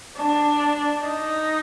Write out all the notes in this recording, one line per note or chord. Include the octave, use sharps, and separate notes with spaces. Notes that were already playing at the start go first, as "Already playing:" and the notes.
D4
D#4